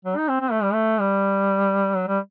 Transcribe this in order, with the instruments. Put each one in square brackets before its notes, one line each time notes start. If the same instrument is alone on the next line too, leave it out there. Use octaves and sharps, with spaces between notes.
[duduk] F#3
D#4
C4
C4
A3
G3
A3
G3
F#3
G3